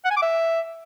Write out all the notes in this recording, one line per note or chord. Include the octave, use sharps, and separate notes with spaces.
F#5
G#5
D6
E5